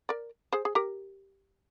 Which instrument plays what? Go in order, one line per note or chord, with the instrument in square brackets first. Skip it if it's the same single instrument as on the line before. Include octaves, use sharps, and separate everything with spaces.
[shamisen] A#4 D5
G#4 C5
G#4
G4 A#4